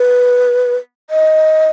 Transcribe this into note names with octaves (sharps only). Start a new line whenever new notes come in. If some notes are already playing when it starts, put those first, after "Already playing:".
Already playing: B4
D#5